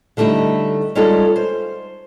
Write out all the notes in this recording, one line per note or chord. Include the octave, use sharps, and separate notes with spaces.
D3 G3 A3 D#4 E4
G3 G#3 C#4 D#4 F4 A4
C5